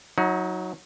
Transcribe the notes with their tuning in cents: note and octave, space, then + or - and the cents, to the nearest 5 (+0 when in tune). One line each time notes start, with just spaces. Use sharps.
F#3 -10 D#4 +30